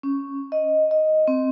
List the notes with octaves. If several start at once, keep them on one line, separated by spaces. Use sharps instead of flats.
C#4
D#5
D#5
C4